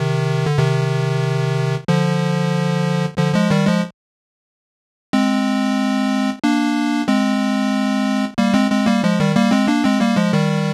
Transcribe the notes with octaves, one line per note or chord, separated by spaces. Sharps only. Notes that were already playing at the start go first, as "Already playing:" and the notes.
Already playing: C3 D#3
D3
C3 D#3
D3 F3
D3 F3
F3 G#3
D#3 G3
F3 G#3
G#3 C4
A#3 D4
G#3 C4
G3 A#3
G#3 C4
G#3 C4
G3 A#3
F3 G#3
D#3 G3
G3 A#3
G#3 C4
A#3 D4
G#3 C4
G3 A#3
F3 G#3
D#3 G3